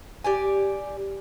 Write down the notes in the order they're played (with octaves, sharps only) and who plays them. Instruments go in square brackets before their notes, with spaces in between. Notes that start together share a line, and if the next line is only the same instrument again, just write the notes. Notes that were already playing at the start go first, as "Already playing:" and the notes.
[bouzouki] G4 D5 G#5